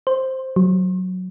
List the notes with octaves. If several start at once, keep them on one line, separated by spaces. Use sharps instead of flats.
C5
F#3